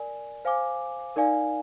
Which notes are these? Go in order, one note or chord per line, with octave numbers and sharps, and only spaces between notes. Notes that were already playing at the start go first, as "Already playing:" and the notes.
Already playing: A#4 D5 G#5
C5 F5 G#5 D6
D#4 A#4 D5 F5 G#5